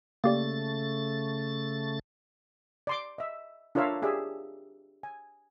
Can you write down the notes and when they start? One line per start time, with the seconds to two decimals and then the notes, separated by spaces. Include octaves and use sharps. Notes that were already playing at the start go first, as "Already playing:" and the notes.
0.24 C#3 A3 A#3 G4 D5 A6
2.87 D5 C6 D6
3.18 D#5 E5
3.75 D4 F4 A#4 C#5 E5 F5
4.02 G4 G#4 D5 E5
5.03 G#5